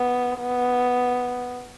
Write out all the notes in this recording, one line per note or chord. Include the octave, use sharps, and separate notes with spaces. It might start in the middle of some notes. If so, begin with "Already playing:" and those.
Already playing: B3
B3